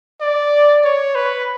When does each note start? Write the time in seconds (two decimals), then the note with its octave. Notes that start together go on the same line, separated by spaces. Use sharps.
0.21 D5
0.84 C#5
1.15 B4